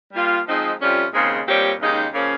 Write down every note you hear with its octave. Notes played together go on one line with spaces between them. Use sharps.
G3 A#3 F4
F3 G#3 C4 D#4 G#4
F2 C3 G3 C#4 F4
D#2 C#3 G#3 C4 D#4
A#2 G3 C4 G4 C#5
D#2 C#3 G#3 D#4 G4
C#3 F3 A#3 C#4